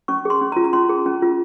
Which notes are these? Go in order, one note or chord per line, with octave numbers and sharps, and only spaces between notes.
C#4 C#6
G#4 C6
C#4
A#5
F4
A#5
C#4 C6
G#4
C#4
F4